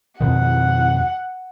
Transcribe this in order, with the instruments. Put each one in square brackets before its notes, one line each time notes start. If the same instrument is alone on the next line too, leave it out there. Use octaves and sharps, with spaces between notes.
[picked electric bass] F2 B2 D#3 [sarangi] F#5